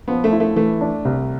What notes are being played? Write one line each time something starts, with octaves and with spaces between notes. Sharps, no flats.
F3 B3
A3
E4
A3
E3 A3
D4
C2